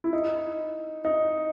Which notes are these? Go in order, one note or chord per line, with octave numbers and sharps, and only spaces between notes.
E4
D#4
D#4